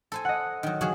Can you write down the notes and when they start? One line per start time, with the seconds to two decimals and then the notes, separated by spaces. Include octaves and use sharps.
0.12 A4 C5 G#5
0.25 D#5 F#5
0.63 D#3 F#3
0.81 F#3 F#4 G#4 F5